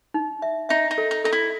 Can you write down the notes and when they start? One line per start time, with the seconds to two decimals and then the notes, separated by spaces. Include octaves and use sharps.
0.14 D#4
0.42 E5
0.69 D#4 E5
0.91 D#4
0.98 A4
1.11 D#4
1.24 D#4 A4
1.32 E4